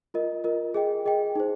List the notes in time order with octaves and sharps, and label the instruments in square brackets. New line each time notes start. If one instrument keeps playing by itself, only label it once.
[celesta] F4 A#4 D#5
F4 A#4 D#5
G#4 D#5 G5
G#4 D#5 G5
D#4 G#4 C5